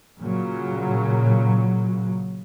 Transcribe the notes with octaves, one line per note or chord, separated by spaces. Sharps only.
A#2 C#3 F#3